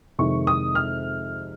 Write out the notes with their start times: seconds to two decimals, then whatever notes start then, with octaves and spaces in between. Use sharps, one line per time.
0.19 F2 C3 D#3 G#3 C#6
0.47 D#6
0.75 F6